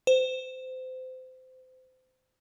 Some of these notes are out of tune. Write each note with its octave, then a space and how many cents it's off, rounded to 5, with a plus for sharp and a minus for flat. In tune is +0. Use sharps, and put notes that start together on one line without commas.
C5 -25